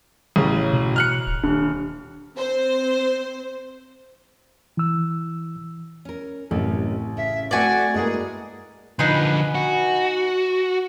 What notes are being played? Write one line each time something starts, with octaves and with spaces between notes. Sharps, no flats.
A1 A2 C#3
B2
F6 F#6 C#7
D1
D#1 D4
C4 C5
E3 E6
C#4 A#4
A1 F#2 C3
C#3 E5
A3 C4 F#4 A4 D5 G#5
G2 G#3 A#3 E4 F#4 G#4
D3 F3 D#4 G#4 B4
F#4